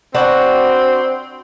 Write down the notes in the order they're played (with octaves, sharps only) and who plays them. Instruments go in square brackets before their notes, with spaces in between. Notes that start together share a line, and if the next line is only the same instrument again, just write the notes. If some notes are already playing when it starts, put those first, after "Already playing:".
[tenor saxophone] C4 [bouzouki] D4 F#4 B4